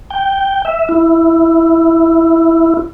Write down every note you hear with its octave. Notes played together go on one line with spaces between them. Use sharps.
G5
E5
E4